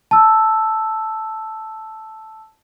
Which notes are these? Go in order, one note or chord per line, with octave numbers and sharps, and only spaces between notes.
A5 E6